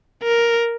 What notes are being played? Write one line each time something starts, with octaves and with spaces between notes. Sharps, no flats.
A#4